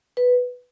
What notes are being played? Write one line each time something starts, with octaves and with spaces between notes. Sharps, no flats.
B4